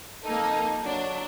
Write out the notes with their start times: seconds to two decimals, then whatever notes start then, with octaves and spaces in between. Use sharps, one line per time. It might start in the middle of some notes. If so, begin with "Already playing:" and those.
0.24 F2 A#3 D#4 A4
0.83 F#3 D4